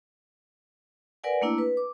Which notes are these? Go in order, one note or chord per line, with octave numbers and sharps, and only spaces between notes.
A#4 B4 D5 F#5 G#5
A3 A#3 D4 E4
B4
D6